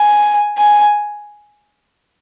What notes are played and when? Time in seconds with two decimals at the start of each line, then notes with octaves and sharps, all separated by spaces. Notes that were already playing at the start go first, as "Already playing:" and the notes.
Already playing: G#5
0.58 G#5